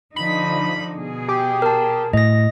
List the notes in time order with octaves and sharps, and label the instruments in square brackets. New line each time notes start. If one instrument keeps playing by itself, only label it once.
[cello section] D3 F3 D#4 [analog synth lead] B5
[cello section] B2 G#4
[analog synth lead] G4
[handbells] A#4 A5
[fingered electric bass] A2 [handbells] D#5 A#6